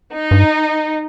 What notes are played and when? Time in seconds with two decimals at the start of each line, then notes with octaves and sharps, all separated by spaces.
0.14 D#4
0.31 G2